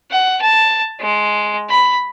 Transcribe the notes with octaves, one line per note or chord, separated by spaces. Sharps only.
F#5
A5
G#3
B5